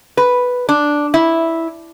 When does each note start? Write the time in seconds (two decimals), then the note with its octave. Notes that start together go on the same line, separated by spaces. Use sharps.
0.17 B4
0.69 D4
1.14 E4